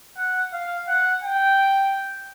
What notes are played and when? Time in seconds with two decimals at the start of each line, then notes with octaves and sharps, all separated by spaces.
0.17 F#5
0.53 F5
0.88 F#5
1.23 G5